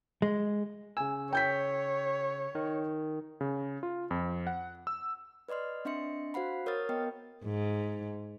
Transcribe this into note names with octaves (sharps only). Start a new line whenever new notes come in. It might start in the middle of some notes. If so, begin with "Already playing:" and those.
G#3
C#3 G#5 E6
C#5 G5 G6 B6
D#3
C#3
F4
F2
F#5
E6
B4 D5 D#5 C6 F6
C4 D4 D#5 E5 C6 C#7
F#4 C5 F5 F#5 B5
A#4 C#5 D#6 F6 A6
B3 A#4 D#5 G5
G#2